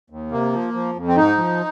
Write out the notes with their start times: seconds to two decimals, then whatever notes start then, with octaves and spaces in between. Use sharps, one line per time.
0.10 D#2
0.31 C3 A#3
0.52 F3
0.74 F3
0.96 F2
1.08 C4
1.16 G#2 D#4
1.37 F3